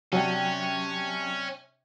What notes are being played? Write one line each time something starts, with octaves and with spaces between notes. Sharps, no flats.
C3 F#3 C#4 D4 G5